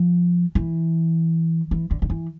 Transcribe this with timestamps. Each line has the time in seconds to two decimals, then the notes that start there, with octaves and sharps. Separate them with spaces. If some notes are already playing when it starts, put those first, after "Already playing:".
Already playing: F3
0.55 E3
1.71 E3
1.91 D3
2.02 D3
2.10 E3